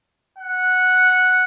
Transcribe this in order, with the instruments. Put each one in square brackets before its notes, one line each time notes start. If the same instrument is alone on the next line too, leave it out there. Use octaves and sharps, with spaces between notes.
[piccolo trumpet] F#5